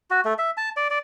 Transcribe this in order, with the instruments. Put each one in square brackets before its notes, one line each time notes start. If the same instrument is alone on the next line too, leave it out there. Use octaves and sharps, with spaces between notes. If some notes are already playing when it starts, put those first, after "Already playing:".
[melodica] F#4
A3
E5
A5
D5
D5